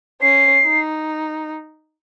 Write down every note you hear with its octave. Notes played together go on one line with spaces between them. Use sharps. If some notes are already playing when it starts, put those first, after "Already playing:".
C#4 C7
D#4